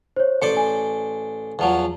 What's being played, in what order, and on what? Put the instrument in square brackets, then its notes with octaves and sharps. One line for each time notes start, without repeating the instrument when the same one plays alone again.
[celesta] C5 C#5
[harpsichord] A1 C5 D5 [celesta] C#7
[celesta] G#5
[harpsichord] E2 F3 F#3